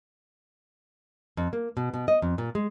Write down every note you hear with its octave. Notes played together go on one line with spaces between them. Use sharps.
F2
A#3
B2
B2
D#5
F2
A#2
G#3